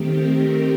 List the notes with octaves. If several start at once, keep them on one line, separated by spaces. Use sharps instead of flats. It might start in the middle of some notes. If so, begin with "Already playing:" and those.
Already playing: D#3 A3 C4 G4
A#4
A#4